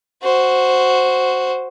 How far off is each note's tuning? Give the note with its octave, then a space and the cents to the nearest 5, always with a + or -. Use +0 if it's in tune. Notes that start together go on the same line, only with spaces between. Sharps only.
F#4 +0 C5 +0